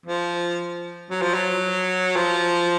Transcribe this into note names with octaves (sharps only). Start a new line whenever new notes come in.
F3
F#3
F3
F#3
F3